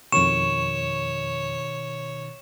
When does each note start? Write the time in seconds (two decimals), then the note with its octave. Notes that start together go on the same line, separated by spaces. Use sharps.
0.12 F2 B2 D#3 C#5 C#6 E7